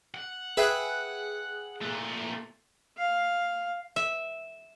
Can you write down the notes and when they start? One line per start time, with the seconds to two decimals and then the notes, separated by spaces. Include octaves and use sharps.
0.15 F#5
0.57 G#4 B4 E5 G5 F#6
1.82 A#2 A3
2.97 F5
3.96 E5